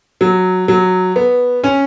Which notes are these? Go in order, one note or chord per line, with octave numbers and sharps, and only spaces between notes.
F#3
F#3
B3
C#4